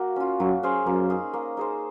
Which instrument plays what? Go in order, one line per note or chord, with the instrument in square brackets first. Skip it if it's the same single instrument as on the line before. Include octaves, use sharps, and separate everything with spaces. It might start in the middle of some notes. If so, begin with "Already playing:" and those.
Already playing: [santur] A#3 F#4
C#4 F4
[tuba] F#2 [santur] F#3
[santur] C#4 G#4 C5
[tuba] F#2 [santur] A#3
[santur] D#4 G#4
A#3
D#4 G#4 C5